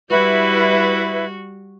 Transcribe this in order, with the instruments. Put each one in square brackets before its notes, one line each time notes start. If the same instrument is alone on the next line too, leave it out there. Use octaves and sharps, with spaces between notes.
[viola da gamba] G3 F#4 [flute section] E4 B4